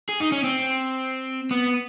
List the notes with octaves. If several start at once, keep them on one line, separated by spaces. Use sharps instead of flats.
G#4
D#4
C#4
C4
B3